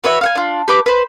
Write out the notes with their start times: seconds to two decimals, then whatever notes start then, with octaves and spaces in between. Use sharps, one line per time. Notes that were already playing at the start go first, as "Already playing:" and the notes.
0.04 F#4 B4 C#5 E5
0.21 F5 F#5 G#5
0.35 D4 F4
0.68 G4 B4 D6
0.86 B4 C5